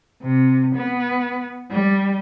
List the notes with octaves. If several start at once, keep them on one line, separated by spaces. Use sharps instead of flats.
C3
B3
G3